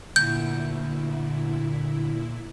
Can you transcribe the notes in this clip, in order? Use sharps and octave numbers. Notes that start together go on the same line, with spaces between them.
D2 A#2 E4 G6